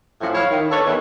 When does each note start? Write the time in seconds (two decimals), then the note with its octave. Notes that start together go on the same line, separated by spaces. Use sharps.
0.21 F#2 A2 F3 E4
0.34 E4 C#5 E5 F5
0.50 D#3
0.70 D4 A4 B4 C#5
0.84 E2 D#3 E3 B3 E4